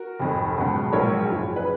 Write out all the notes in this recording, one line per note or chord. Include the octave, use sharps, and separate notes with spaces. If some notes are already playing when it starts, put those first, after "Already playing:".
Already playing: F#4 A#4
F1 F2 D#3
C#2 B2 F#3
A#1 G#2 F#3 A#4 C#5
F#1 F#2 C#3 F3
B4